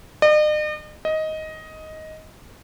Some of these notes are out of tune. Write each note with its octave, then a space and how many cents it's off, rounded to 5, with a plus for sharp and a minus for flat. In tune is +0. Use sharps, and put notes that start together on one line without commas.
D#5 -45
D#5 +10